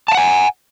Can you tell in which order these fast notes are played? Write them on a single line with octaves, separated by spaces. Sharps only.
A5 F5 F#5 G#5